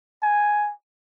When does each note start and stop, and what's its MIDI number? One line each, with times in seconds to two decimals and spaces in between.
0.22 0.72 80